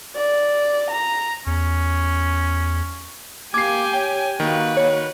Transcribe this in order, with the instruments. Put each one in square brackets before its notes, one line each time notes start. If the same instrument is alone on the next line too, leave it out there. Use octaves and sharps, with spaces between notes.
[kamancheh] D5
A#5
[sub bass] E2 [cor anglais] C#4
[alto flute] A#3 [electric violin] G4 G#5 [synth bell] D6 [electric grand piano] G#6 C7
[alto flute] C#5 [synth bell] G5
[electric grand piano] D#3 [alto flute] A#3 [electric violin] F#4 B4
[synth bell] C#5